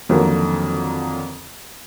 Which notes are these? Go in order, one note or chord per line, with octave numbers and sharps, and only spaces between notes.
F2 D3 D#3 F#3 A#3